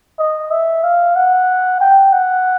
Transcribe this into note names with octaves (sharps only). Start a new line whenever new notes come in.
D#5
E5
F5
F#5
G5
F#5